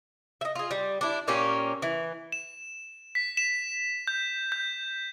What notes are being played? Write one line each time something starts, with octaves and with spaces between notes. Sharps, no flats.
D#5 E5
F4 G#4
G3
D4 E4
A#2 A#3 C#4 G4
E3
E7
B6
E7
G6
G6